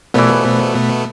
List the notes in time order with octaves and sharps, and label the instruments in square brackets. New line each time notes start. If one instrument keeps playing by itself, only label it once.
[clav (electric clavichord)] A#1 E3 [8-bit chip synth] B2 A3 B3